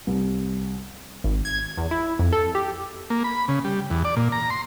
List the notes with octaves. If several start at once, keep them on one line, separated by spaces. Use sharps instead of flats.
C2
G#1
G#6
E2
E4
F2
A4
G4
A#3
B5
C#3
G3
E2
D5
A#2
A#5
C6